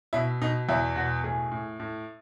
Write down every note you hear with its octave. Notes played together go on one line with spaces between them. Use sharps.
B2 E4
B2 D#4
E2 E4
B2 F#4
A2 G#4
A2
A2